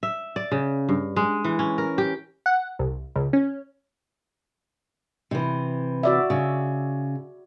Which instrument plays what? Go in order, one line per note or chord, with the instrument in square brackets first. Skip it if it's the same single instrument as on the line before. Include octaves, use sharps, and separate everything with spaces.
[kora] E5
D5
C#3
G2
G#3
E3
C#4
A#4
G4
[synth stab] F#5
C2
C#2
C#4
[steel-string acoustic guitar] C3 E3
[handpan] F#4 D5 E5
[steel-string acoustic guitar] C#3